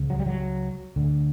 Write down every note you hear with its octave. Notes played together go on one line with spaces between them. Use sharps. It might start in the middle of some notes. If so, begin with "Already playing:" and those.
Already playing: C#2 C#3
F#3
G3
F#3
D2 D3